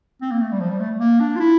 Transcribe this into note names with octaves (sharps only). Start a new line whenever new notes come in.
C4
A#3
A3
G3
F3
G3
A3
A#3
D4
F4
E4